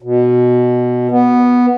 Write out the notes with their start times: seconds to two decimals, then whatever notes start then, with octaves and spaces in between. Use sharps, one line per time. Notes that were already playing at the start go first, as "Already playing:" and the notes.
0.02 B2
1.11 B3